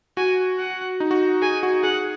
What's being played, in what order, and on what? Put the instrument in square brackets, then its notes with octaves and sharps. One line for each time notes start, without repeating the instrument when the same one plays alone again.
[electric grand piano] F#4 [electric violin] G#5
[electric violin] F#5
[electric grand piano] D#4
F#4
[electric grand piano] G#4 [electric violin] G#5
[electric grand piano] F#4
[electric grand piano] G#4 [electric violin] F#5